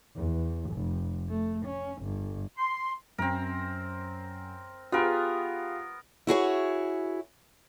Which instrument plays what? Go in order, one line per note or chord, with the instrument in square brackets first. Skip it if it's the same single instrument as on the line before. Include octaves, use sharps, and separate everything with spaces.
[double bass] E2
F1
A3
C#4
G1
[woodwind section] C6
[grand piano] F#2 [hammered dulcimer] C4 A#4
[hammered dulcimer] B3 A#4 [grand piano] F4 G4 G#4
[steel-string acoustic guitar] E4 F#4 G#4 C#5